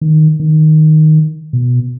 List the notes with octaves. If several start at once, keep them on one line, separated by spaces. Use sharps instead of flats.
D#3
D#3
B2